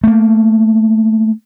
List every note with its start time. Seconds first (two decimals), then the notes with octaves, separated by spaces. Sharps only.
0.04 A3 A#3